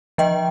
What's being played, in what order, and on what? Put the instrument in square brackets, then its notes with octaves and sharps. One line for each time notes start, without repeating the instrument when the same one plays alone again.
[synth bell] F3 D#5 G5